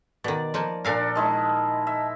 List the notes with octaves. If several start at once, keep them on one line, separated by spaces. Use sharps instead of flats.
B2 D#3 D5
F3 A#3 D#4
A#2 D4 A4 A#4 F5 G#5
D#3 G#3 E4 A5
E5